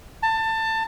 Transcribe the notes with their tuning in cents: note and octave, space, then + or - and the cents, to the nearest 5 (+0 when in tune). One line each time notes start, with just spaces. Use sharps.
A5 +20